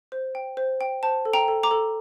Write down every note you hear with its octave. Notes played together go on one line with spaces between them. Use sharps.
C5
G5
C5
G5
C5 A5
A4
G5 A#5
A4
A#5 D6
A4